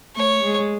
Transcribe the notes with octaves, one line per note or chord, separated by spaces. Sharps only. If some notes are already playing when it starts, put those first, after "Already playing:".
A3 C#5
G#3